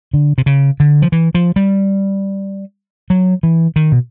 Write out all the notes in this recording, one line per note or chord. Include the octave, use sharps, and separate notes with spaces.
D3
C3
C#3
D3
F3
E3
F3
G3
F#3
E3
D#3
B2